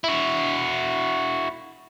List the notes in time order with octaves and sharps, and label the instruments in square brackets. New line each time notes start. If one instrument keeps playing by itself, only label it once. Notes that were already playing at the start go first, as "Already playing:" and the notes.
[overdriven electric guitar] E4 F#4